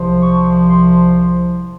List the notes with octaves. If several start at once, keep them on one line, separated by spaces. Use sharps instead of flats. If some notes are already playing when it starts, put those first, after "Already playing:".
Already playing: C2 C3 F3
C#6
C6